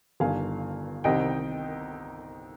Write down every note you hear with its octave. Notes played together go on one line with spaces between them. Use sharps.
G1 G2 D#3 F5 G#5
C2 C3 D#3 D#5 G5